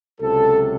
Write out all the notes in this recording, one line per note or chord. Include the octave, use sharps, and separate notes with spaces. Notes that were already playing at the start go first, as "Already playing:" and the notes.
C#2 C3 F#3 A4